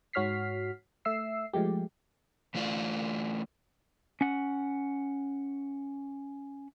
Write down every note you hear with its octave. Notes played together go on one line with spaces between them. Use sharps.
G#2 F#4 C#5 F6 B6 C7
A3 E5 E6 C7
F3 G#3 A3 G4
E3 A3 F4 D5
C#4 F#5